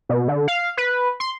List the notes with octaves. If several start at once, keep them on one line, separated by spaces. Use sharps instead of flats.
B2
D3
F5
B4
C6